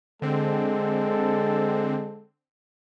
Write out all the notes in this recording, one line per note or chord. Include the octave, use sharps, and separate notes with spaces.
D3 G#3 C4 A4